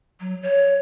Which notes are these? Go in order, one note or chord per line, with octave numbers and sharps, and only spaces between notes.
F#3
C#5